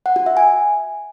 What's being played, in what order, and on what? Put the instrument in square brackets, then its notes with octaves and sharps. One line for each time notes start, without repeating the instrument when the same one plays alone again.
[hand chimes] F#5
F#4
E5
G#5